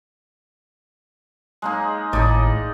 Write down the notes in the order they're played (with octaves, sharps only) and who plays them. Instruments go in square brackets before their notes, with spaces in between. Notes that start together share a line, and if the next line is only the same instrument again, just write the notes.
[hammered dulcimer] G#3 A#3 D#4
[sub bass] G#1 [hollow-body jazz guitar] A2 [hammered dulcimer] D#4 D5